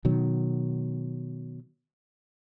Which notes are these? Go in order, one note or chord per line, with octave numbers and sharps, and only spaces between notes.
B2 D#3 F#3